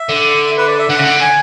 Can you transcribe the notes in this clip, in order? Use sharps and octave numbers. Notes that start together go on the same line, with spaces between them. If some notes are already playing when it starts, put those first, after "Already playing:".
Already playing: E5
D3
B4
D5
E5
D3 F#5
C#3
D3
G#5